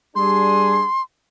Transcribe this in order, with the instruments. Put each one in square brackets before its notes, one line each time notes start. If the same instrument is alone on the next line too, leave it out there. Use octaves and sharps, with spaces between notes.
[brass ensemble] G3 D4 G#4 [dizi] C6